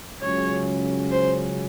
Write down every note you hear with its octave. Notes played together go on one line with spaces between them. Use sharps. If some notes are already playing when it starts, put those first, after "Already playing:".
C#2 C#3 F#3 C#4 C#5
C5